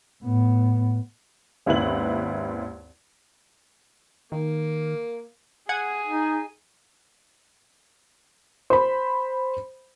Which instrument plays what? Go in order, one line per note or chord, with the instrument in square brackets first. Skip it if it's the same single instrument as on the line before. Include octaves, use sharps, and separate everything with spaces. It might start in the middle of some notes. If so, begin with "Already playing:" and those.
[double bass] A2 B3
[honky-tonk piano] G#1 D#2 C#4 E4 B4 F#7
[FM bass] D#3 [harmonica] A#3
[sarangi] G#4 [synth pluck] F#5 G#6 [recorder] G#5
[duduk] D#4
[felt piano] C5 B5